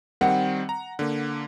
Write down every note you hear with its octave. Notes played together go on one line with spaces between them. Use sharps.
D#3 G3 C4 F#5
A#5
D3 A#3